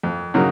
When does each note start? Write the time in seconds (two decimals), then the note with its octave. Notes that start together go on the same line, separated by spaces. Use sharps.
0.03 F2
0.34 C#3 F#3 A#3 D#4